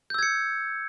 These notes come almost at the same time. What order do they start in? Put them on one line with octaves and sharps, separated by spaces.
G6 E6 G#6 C#7